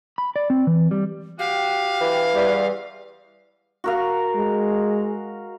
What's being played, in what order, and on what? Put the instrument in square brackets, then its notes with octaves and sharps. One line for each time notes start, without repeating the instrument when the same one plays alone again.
[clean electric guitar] B5
D5
C4
E3
G3
[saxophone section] F#4 G4 [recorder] F5
[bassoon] E3
[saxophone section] E2 [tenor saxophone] G3
[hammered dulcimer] F#4 A#4 F5
[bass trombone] G#3